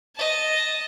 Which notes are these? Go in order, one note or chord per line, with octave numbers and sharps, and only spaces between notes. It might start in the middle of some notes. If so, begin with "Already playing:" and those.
D#5 A5